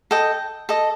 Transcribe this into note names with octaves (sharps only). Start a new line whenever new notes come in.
A4 D#5 G5
A4 D#5